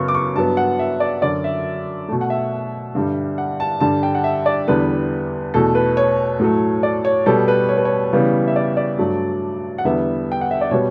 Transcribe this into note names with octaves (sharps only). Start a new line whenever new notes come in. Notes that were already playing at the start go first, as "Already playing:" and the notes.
Already playing: F#2 C#3 F#3 B3 C#6
D6
C#6
G2 F#3 B3 A5
F#5
E5
D5
F#2 D3 F#3 D5
E5
B2 A3
F#5
E5
G2 D3 G3
F#5
A5
G2 D3 G3 A5
G5
F#5
E5
D5
E2 D3 G3 B3 B4
E2 B2 A3 A4
B4
C#5
A2 F#3 A3
D5
C#5
B2 G3 B3 A4
B4
C#5
B4
C#5
C#3 E3 G3 B3
E5
D5
D5
G2 F#3 A3
F#5
E2 D3 G3 B3 E5
G5
F#5
E5
D5
B2 G3 B3 C#5